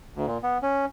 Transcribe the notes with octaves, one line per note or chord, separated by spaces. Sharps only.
D2
A#2
B3
C#4